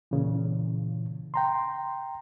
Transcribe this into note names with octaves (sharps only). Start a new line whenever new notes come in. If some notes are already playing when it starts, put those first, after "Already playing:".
A#2 C#3 E3
G5 A#5 C6